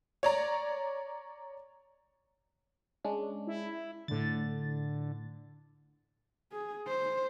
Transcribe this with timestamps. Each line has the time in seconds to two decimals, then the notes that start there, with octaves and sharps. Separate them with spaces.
0.23 C#5 D5 A#5
3.05 G#3 C#4 D4
3.47 E4
4.08 A2 D3 A6
6.52 G#4
6.87 C5